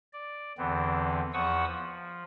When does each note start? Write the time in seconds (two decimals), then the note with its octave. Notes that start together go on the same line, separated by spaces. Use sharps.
0.13 D5
0.58 E2 D3 E3 B3 C4
1.33 E2 F3 F#5 C#6 D#6 E6
1.67 F3